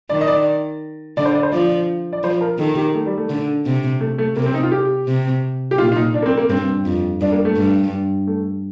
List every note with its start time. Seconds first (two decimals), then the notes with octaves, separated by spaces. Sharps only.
0.10 D#3 D5
0.21 D#5
0.28 D5
1.17 D3 D5
1.25 C5
1.35 D5
1.43 C5
1.52 F3 D5
2.13 D5
2.23 F3 C5
2.41 A#4
2.59 D#3 A4
2.77 G4
2.94 A3
3.06 G3
3.18 A3
3.30 D3
3.66 C3
4.00 A3
4.18 A3
4.36 C3 A#3
4.46 C4
4.54 D#4
4.63 F4
4.72 G4
5.08 C3
5.71 G4
5.78 A#2 F4
5.92 F4
5.96 D#4
6.14 D4
6.22 A#3
6.26 C4
6.37 A#3
6.50 G2 C4
6.85 F2
7.21 G2 D4
7.32 A#3
7.45 A3
7.56 G2
8.27 A3